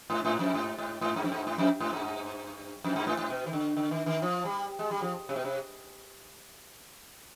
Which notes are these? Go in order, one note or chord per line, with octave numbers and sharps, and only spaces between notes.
G#2
G#2
F2
G#2
G#2
G#2
G2
F2
G2
G#2
F2
G#2
G2
F2
G2
G#2
G#2
B2
D#3
D3
D3
D#3
D#3
F3
G3
G#3
G3
F3
C3
B2
C3